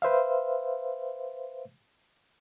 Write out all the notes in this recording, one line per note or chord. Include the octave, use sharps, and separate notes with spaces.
B4 C5 E5 F5